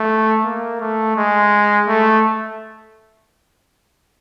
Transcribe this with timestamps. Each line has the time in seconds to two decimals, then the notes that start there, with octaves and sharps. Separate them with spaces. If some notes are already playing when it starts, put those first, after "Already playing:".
Already playing: A3
0.45 A#3
0.80 A3
1.17 G#3
1.88 A3